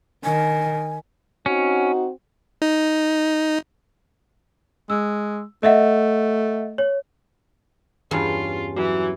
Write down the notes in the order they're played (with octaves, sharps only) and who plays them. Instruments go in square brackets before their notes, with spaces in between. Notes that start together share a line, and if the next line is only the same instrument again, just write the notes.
[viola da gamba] D#3 [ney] G#5
[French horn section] C4 D#4 F#4 [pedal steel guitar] C#4
[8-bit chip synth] D#4
[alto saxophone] G#3 [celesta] E6
[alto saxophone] A3 [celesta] D#5 E5 F#5
[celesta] C#5
[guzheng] E2 G2 C#4 [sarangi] F4
[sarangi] E3 [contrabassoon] F#3